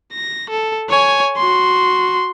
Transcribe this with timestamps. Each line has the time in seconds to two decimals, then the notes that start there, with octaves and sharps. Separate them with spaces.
0.13 A#6
0.50 A4
0.89 C#5 G#5
1.37 F#4 C6